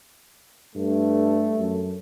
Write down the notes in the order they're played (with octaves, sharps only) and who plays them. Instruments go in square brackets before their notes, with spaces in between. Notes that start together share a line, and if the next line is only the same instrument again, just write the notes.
[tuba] G2 [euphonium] A3
[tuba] F#2